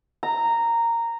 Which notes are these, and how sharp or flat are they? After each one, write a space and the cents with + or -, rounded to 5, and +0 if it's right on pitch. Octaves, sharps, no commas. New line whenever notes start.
A#5 -10